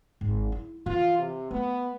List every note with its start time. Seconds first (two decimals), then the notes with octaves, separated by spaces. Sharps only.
0.21 G#1
0.52 E4
0.86 E3 F4
1.18 C3
1.51 A3 B3